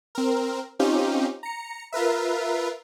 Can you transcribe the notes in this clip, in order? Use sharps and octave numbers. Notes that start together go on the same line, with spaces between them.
C4 A#4
C4 C#4 D#4 F4 G4
A#5 C#7
F4 A#4 B4 E5